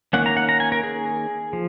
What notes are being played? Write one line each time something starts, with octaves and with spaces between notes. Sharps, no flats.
D#3 A#3 C#4 F#5
A#5
F#5
A#5
G#5
A#4
G#4
F3